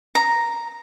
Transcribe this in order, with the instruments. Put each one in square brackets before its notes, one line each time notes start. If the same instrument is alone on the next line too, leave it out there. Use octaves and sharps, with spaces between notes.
[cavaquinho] A#5